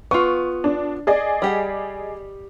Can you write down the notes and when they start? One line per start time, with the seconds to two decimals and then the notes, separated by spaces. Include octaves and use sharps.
0.11 B3 F4 C#6
0.64 D4
1.07 G#4 D5 D#5
1.42 G3 G4 F#5